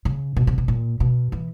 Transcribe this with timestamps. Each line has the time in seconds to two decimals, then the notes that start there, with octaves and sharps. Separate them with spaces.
0.05 C#3
0.36 B2
0.47 C3
0.58 B2
0.68 A#2
1.00 B2
1.32 E3